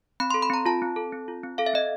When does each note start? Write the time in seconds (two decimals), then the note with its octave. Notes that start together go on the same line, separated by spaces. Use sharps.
0.20 C4 B5
0.30 A4 C6
0.42 B5
0.50 C4 A#5
0.66 F4 A5
0.82 C4
0.96 A4
1.12 C4
1.28 F4
1.44 C4
1.58 A4 F5
1.66 E5
1.73 C4 D#5